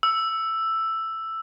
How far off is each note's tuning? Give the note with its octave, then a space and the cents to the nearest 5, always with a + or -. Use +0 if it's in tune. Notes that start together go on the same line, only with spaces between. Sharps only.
E6 +5